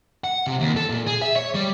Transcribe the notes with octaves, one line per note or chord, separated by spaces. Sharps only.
F#5
C3
D#2
A4
A#2
G#4
E5
C#5
G3